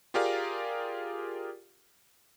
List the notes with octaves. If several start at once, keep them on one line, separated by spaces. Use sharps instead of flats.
F4 G4 G#4 A#4 D5 F5